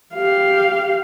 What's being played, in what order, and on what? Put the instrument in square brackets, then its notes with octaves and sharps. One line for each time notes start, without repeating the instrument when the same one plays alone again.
[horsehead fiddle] G4 F5